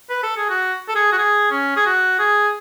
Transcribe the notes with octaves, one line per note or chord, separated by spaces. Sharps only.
B4
A4
G#4
F#4
A4
G#4
F#4
G#4
C#4
G#4
F#4
G#4